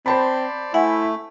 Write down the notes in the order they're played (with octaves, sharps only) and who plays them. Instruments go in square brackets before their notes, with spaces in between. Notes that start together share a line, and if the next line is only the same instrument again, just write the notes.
[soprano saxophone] C4 [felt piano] C5 A5 B5 [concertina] D5
[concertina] A3 [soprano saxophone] E4 [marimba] E5 F#5 G#5